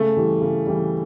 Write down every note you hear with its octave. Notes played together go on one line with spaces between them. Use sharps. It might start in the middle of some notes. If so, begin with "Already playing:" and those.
Already playing: C#3 A3
E3 G3
C#3
E3 G3